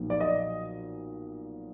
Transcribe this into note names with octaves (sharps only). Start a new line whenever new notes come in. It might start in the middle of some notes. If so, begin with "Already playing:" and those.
Already playing: B1 A#2 F3
D5
D#5